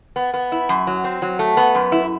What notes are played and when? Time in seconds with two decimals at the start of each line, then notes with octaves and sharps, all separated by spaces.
0.16 B3
0.34 B3
0.52 E4
0.69 F#2
0.87 F#3
1.04 C4
1.22 F#3
1.39 A3
1.57 B3
1.75 F#2
1.92 E4